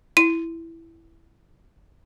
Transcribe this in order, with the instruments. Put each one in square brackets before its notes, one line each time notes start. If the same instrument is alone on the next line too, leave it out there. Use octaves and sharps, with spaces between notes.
[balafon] E4 [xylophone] D#7